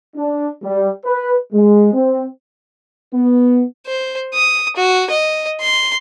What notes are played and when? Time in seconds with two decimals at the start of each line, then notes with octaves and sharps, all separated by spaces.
0.16 D4
0.62 G3
1.05 B4
1.53 G#3
1.93 C4
3.13 B3
3.87 C5
4.34 D#6
4.76 F#4
5.11 D#5
5.61 C6